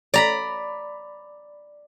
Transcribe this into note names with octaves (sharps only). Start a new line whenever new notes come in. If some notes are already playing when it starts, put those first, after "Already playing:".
D5 A#5 B5